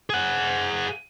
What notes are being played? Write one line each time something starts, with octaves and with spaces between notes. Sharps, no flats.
G#4 F#5